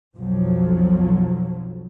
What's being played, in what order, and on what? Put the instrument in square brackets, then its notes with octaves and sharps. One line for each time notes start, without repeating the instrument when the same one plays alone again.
[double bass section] B1 F2 F3 F#3